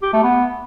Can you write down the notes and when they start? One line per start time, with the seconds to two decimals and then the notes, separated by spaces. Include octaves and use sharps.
0.03 G4
0.13 A3
0.23 B3